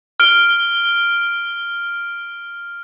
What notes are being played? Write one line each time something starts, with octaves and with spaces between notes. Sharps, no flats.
F6 D7 G7